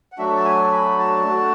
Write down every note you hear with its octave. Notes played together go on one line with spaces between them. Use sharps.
F#5
F#3 A3 D4 F#4 E5
A5
G#5
B5
A5
A3 D4 F#4